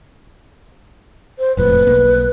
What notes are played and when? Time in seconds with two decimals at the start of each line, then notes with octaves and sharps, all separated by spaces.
1.39 C5
1.57 E1 F2 A2 B4
1.87 B1 A#3